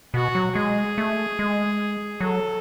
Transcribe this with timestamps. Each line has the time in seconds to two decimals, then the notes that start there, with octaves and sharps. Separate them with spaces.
0.14 B2 F#4
0.35 F#3
0.55 G#3 G#4
0.98 A3
1.39 G#3
2.21 F#3 A4